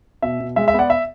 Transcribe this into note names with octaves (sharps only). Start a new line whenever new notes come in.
B2 E5
B2
G#3 E5
E5
B3
D5 F#5
E5